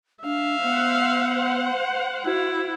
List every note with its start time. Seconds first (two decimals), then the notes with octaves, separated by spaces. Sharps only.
0.24 D4 E5 F5
0.63 B3 C5 F#5
2.26 E4 F#4